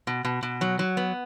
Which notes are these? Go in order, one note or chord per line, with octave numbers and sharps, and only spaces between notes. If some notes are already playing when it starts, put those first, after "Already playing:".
B2
B2
B2
F#3
F#3
B3